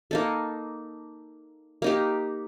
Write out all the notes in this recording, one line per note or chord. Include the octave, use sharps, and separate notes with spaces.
A#3 D#4 A4
A#3 D#4 G4